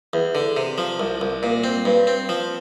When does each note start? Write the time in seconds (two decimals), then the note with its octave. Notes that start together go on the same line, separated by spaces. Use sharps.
0.13 E2
0.35 D3
0.57 C3
0.78 F3
1.00 C2
1.21 C2
1.43 A#2
1.64 C4
1.85 G2
2.07 C4
2.29 F3